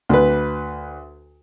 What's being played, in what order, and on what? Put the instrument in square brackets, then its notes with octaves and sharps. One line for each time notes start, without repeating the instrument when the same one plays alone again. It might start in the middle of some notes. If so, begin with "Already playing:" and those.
[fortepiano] D2 B4